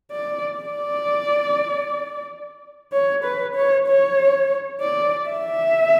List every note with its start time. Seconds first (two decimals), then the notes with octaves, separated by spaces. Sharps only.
0.11 D5
0.58 D5
2.93 C#5
3.24 B4
3.56 C#5
3.88 C#5
4.81 D5
5.29 E5